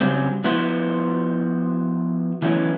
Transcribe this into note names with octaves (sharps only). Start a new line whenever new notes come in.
C#3 F#3 G3 C4
F3 B3 E4 F#4 C5
E3 F#3 A3 B3 C#4 E4